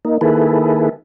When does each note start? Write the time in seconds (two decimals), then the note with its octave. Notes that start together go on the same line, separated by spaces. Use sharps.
0.05 A#3 D#4
0.21 D#3 A#3 E4 G#4 A4 B4